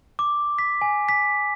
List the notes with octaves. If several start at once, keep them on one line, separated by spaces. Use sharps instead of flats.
D6
B6
G#5
B6